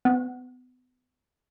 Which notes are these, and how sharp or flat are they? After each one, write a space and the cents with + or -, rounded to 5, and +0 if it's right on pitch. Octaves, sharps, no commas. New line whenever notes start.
B3 +35